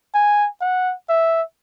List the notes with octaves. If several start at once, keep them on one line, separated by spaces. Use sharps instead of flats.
G#5
F#5
E5